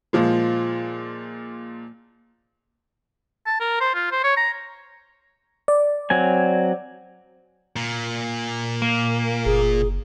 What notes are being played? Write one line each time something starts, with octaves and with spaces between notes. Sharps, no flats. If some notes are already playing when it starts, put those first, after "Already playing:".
A#2 F3 G#3
A5
A#4
C5
F4
C5
C#5
A#5
D5
F#3 C4 G#5
A#2
A#3
F#1 G#4